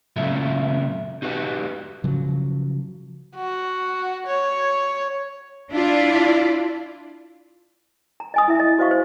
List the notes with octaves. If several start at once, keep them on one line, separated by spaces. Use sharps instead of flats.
A#2 C#3 F#3 A3 E4 F4
D#4 F#4 G4 B4 F#5
C#3 F3 F#3
F#4
C#5
D4 E4 F4 D5
A#5
D#5 G#5 D#6
E4 E5
D#5
F#4 C5 D#5 F5 C#6
C5